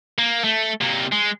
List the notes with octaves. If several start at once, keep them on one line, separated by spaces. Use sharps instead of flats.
A#3
A3
C3 A#3
G#3